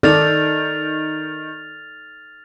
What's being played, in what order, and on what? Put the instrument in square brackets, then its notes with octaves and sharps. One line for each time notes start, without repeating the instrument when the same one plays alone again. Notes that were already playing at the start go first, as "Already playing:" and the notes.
[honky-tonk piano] D#3 [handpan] D#4 A4 D5 [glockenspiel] F6 A6 F7